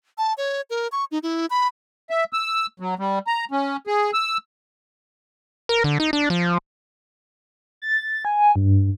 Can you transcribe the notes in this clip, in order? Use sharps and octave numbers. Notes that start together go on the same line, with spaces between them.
A5
C#5
A#4
C#6
D#4
E4
B5
E5
E6
F#3
G3
A#5
C#4
G#4
E6
A#4
D3
D#4
D4
F3
A6
G#5
G2